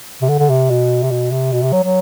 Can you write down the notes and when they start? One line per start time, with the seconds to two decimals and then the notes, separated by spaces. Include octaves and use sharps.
0.22 C3
0.29 D3
0.39 D3
0.50 C3
0.70 B2
1.03 C3
1.11 B2
1.31 C3
1.52 B2
1.63 C3
1.73 F#3
1.84 F#3